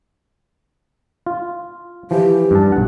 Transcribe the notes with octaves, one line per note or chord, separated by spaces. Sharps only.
F4
E3 F3 G4
G2 A5
B1 F#5